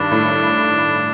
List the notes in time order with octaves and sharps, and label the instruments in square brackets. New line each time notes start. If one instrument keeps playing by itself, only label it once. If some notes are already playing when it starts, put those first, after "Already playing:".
Already playing: [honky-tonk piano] G2 D#3 [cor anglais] D4
[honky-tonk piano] A2